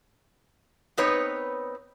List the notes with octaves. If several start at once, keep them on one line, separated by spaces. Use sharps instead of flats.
B3 C4 D#4 B4 C#5